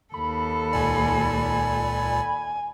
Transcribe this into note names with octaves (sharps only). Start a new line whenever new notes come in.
D#2 A4 B5
C#2 A#2 D5 G#5